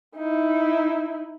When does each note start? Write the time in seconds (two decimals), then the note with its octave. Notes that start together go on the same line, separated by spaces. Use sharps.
0.15 D#4 E4